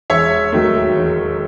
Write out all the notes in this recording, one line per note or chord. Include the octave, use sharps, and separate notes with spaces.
E1 C#5 E5
D#2 D#3 F#3 A3
E1